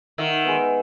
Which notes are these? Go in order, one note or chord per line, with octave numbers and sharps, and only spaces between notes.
D#3 E5 F#5 E6
G#3 B3